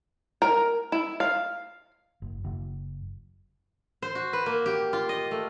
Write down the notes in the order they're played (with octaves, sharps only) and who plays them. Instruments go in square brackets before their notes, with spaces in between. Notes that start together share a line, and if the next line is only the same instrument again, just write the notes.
[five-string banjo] A#4
E4
F5
[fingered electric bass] F#1
F#1
[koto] C5
F#4
B4
A#3
G4
F4
D#5
A3